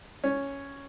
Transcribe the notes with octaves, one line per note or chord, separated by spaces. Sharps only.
C#4